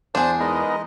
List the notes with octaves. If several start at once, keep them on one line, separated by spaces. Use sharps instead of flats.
E2 D4 G#4 C5 A5
G#3 B3 D#4 A#4 D#5